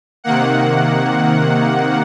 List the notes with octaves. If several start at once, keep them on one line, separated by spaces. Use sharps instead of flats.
C3 D#3 A#3 F#5